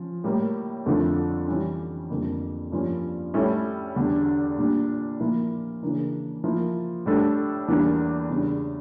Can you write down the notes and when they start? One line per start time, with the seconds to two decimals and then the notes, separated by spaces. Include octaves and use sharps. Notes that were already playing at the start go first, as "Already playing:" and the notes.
Already playing: F3 C#4
0.24 A2 G3 A#3
0.86 F2 D3 F3 A3
1.48 E3 G3 C#4
2.10 F2 D3 G3 A#3
2.72 G2 F3 A#3 C#4
3.34 A2 G3 C#4 E4 A4
3.96 E2 D3 G3 D4
4.58 A#2 G3 D4
5.20 A#2 F3 A#3 E4 A#4
5.83 C#3 E3 A#3 D4
6.44 F3 A#3 E4
7.06 A2 G3 D4 A4
7.68 E2 E3 G3 A#3 D4
8.29 E2 C#3 G3 D4